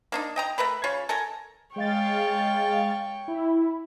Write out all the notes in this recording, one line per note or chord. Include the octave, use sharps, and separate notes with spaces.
A#3 D4 D#4
D#5 G5 A#5
A3 A#4 B4 B5
C#3 F4 C#5
A4 A#4 G#5 A#5
G#3 C#5 F5 G5 A6
E4